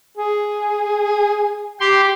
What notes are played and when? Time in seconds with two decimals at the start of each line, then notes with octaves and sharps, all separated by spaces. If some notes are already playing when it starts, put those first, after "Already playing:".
0.18 G#4
1.80 G4 C6